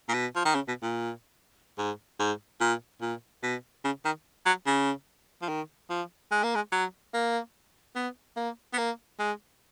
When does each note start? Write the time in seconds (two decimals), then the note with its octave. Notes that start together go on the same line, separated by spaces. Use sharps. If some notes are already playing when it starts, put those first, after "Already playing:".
0.08 A#2
0.13 B2
0.36 F3
0.45 D#3
0.55 C#3
0.68 B2
0.82 A#2
1.78 G#2
2.19 G#2
2.60 A#2
3.01 A#2
3.43 B2
3.84 C#3
4.04 D#3
4.46 F#3
4.66 C#3
5.42 F3
5.48 D#3
5.90 F3
6.31 G#3
6.43 A#3
6.55 G#3
6.72 F#3
7.14 A#3
7.95 B3
8.37 A#3
8.73 B3
8.78 A#3
9.19 G#3